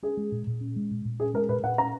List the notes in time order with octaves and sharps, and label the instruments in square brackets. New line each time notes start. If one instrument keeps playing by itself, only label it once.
[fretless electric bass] C#4 [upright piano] G#4
[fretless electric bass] G#3
A#2
A#2
C#4
G#3
A#2
A#2
[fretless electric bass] C#4 [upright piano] G#4
[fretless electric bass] G#3 [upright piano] A#4
[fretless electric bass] A#2 [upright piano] B4
[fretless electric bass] A#2 [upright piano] F#5
[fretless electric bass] C#4 [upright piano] A#5